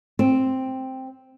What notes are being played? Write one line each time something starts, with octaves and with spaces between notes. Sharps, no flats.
C4